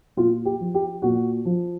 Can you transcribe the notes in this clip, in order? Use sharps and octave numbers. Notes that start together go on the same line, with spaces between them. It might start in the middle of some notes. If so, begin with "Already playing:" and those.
A#2 F4
G4
F3
G4
A#2 F#4
F3